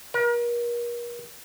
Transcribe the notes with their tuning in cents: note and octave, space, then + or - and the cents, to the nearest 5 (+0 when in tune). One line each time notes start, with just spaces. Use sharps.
A#4 +40